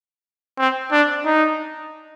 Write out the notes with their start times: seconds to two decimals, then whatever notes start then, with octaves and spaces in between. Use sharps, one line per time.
0.58 C4
0.92 D4
1.25 D#4